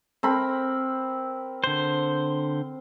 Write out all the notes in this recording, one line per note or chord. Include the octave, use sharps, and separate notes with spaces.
C4 A#4 B5
D3 C5